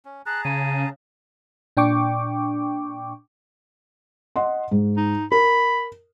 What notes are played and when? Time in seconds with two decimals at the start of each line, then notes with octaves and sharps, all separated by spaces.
0.05 C#4
0.26 G#4 A5 A#5 F#6
0.45 C#3 D#7
1.77 A#2 D4 G5 C#6 D6
4.36 D#5 F#5 C6
4.71 G#2
4.97 D#4
5.32 A#4 B5